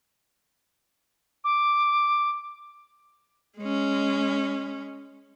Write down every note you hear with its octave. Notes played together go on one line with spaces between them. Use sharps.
D6
G#3 C#4